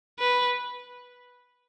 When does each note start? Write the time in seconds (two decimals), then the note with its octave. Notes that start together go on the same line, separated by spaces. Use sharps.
0.19 B4